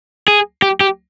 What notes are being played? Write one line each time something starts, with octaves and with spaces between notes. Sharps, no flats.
G#4
G4
G4